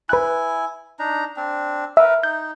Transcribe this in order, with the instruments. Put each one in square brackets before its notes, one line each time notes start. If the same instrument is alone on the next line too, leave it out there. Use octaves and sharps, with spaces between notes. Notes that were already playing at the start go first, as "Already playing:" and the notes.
[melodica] E4 G#5 [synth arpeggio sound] B4 F#6
[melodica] D4 D#4 A#5
C4 D4
[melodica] A#4 B4 [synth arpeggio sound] E5
[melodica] D#4 [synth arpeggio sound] G6